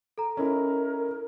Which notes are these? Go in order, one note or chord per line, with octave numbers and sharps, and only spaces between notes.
A4 A#5
C#4 D#4 E4 A#4